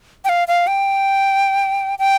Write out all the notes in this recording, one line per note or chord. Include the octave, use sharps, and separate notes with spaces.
G5
F5
F5
G5
G5